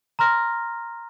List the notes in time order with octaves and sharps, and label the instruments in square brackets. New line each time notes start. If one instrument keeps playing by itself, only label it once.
[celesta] A#5 C6 F6 A#6